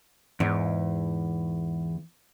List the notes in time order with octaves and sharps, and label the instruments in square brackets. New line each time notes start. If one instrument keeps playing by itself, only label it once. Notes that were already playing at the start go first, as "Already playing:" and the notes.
[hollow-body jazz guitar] E2 [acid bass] G#2